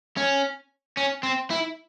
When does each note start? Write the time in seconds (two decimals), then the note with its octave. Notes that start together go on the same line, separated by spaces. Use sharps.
0.17 C#4
0.97 C#4
1.23 C4
1.50 E4